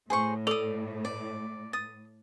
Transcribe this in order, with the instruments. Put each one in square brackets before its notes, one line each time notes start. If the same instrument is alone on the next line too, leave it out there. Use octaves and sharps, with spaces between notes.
[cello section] A2 [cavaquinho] G#4 C5 C#6
[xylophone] A4 F7 [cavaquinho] D5 D#6
[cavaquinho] D5
[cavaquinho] D#6 [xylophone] A6